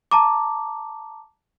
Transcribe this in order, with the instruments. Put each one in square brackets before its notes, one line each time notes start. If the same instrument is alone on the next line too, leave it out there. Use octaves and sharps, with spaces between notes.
[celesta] A5 A#5 D6